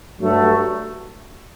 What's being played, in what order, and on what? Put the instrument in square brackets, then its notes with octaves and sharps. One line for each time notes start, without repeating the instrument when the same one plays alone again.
[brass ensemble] G2 F#3 A3